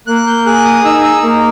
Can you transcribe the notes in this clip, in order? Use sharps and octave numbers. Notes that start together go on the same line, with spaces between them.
A#3 F#6
G6
G#4 F#6
D#6
D#4 E6
E6
A#3